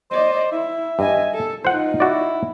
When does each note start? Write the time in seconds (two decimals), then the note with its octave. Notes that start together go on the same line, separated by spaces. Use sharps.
0.11 C5 D5 D#5
0.52 E4 E5
0.99 G2 D#5 G#5
1.34 A4
1.65 D#4 F4 C5 F#5
2.00 E4 F#4 D5